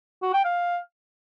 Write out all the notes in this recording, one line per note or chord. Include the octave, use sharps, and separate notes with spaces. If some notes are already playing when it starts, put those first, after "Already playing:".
F#4
G5
F5